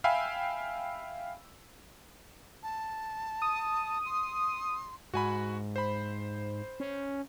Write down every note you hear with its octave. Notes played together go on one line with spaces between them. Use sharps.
E5 F5 G5 G#5 B5 E6
A5
D#6
C6
G#2 F#4 G#5 B5
C5 B5
C#4